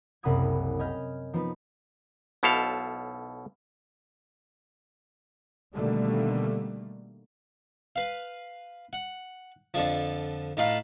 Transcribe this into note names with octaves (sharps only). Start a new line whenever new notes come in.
F#1 C2 F#5 B5 D#6 G#6
D#5 G#5 B5 F6 G6
F3 B3 D#4 B4
B1 B2 E4 A4 C5 F5
B2 D3 D#3 G3 A3 A#3
B4 F5
F#5
F2 D3 F3
A2 D#4 F4 F5 B5